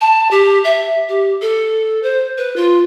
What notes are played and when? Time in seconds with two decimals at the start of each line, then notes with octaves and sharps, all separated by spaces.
0.01 A5
0.31 G4
0.64 E5
1.08 G4
1.41 A4
2.03 C5
2.37 B4
2.56 F4